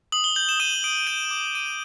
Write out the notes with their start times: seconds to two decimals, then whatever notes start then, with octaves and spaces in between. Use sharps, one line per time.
0.12 D#6 F#7
0.24 G7
0.36 G6 F#7
0.49 E7
0.60 D#6 D#7
0.84 D#6 D7
1.07 G6 D#7
1.31 D6
1.55 D6 D#7